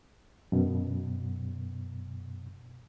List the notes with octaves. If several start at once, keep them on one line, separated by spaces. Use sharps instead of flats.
F#2 B2